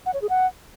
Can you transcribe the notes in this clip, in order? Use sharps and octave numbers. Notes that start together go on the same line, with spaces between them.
F#5
C#5
G#4
F#5